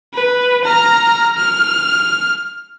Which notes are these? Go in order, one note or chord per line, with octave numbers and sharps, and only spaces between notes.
B4
A#5 F6
F6